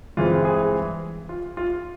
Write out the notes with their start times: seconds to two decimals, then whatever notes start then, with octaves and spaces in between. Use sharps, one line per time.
0.17 G2 E3 G#3 C4 F4
0.45 G#4
1.29 F4
1.57 F4